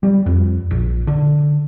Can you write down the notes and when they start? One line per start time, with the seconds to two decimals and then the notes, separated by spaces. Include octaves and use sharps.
0.03 G3
0.26 F2
0.71 A#1
1.07 D3